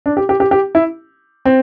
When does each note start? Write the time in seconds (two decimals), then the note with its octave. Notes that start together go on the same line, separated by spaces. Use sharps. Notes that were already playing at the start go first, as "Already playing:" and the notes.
0.06 D4
0.17 G4
0.29 G4
0.40 G4
0.51 G4
0.75 E4
1.45 C4